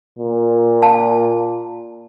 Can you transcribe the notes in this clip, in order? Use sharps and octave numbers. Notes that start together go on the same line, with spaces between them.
A#2
F5 A5